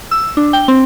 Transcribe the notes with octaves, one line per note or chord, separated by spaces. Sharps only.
E6
D4
G5
C4